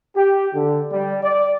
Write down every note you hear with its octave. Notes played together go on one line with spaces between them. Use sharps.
G4
D3
G3
D5